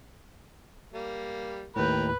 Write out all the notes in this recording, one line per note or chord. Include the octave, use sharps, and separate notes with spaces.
G3 A#3
D#2 A2 A#4 B4 G5